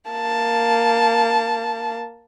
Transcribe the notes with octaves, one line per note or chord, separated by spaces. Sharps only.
A#3 A5